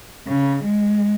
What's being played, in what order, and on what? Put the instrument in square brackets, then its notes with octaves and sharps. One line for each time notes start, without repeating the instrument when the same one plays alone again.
[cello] C#3
G#3